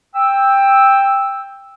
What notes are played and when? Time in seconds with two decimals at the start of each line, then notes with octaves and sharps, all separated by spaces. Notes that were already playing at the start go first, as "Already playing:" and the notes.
0.16 G5 E6